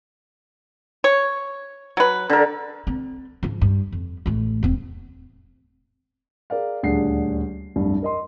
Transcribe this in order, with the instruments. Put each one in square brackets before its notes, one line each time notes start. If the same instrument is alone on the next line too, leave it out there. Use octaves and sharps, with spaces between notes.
[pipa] C#5
F#3 B4
[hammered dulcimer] D3 A#4
[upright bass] C4
G#2 F3
G2
F2
A1 A3
E1 C4
[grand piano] G#4 A#4 D5 F5
D#1 D2 D4 G#4 F#5 C7
F1 C2 G2
A#4 D#5 C6